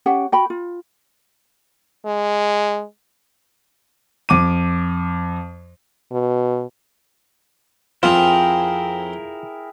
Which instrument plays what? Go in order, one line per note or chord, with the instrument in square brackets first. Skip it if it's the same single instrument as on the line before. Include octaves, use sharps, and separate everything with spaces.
[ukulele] C#4 G4 F#5 G5
F#4 G5 B5
F4
[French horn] G#3
[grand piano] F2 D6 D#7
[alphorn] B2
[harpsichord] F2 C4 [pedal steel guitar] E4 G#4 A#4 [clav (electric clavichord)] F4 [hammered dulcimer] G5